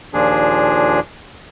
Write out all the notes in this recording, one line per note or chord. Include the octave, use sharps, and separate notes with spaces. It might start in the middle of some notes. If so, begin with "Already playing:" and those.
D#2 A#2 F3 D4 G#4